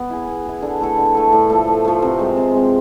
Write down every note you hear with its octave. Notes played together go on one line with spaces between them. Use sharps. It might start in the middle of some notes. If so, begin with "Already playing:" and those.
Already playing: B3
E4 G#4
B3
E4 G#4
D3
A3 E4 A4
D3
A3 E4 A4
A2
F3 A3
A2
F3 A3
C3
G#3 C4
C3
G#3 C4